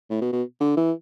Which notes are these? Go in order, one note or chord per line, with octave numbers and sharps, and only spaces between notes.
A2
B2
B2
D3
E3